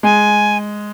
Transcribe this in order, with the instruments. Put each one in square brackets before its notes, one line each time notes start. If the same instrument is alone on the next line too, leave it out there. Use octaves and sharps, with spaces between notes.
[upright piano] G#3 [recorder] G#5